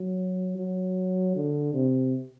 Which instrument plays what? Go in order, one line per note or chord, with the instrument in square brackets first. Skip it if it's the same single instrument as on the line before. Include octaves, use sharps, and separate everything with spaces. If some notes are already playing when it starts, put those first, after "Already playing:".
Already playing: [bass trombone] F#3
F#3
D3
C3